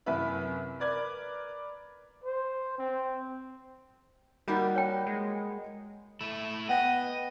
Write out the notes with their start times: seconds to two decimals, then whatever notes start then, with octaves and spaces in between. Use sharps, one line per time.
0.06 F#2 C3 E4 B4 E5
0.80 A#4 B4 D5 G#6
2.24 C5
2.78 C4
4.48 G3 A#3 D#4 F#4 A#4 B5 G6
4.76 C#5 G5
5.07 G#3
6.21 A3 E4
6.69 B3 D#5 F#5 G5 A#6